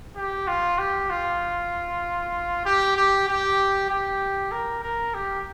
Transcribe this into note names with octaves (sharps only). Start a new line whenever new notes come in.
G4
F4
G4
F4
G4
G4
G4
G4
A#4
A#4
G4